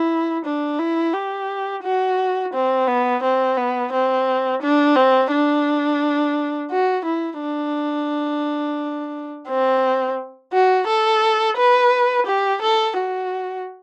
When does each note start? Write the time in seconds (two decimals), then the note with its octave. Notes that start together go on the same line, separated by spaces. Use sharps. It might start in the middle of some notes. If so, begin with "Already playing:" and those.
Already playing: E4
0.45 D4
0.79 E4
1.14 G4
1.83 F#4
2.54 C4
2.88 B3
3.23 C4
3.57 B3
3.92 C4
4.62 D4
4.96 C4
5.32 D4
6.71 F#4
7.05 E4
7.41 D4
9.49 C4
10.53 F#4
10.87 A4
11.57 B4
12.26 G4
12.62 A4
12.97 F#4